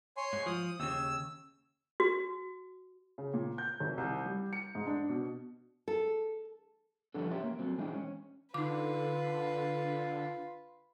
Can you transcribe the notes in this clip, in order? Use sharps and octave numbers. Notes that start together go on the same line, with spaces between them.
C#5 G#5 C6
G#2
F3 D#6
D#2 C#3 E6
F#4
C#3
A#2
G6
G#1
C2
G3
C#7
G#2
D4
B2
A4
F3 G3 B3 D4 A4
C#4 G4 C#5 E5 C6
A#3
F#3 C4
E3 G#3 C4 D4 D#4
C#4
D3 D#4 F4 B4 D6